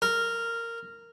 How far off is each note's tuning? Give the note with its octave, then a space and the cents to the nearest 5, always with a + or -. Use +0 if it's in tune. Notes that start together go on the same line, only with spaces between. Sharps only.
A#4 -10